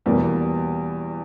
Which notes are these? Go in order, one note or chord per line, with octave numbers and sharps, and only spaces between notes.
E2 B2 G3 A#3